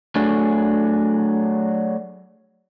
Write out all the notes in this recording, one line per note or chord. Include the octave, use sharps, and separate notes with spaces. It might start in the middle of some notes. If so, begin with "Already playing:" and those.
F#3 A3 D4 G#4